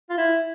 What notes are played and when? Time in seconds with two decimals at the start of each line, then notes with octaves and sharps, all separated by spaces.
0.10 F4
0.17 E4